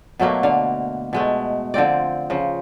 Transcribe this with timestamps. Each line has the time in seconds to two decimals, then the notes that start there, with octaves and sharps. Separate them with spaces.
0.19 B2 F#3 A3 A#3
0.43 D3 F5
1.13 B2 G#3 A3
1.74 D3 F3 C4 D5
2.30 C#3 F3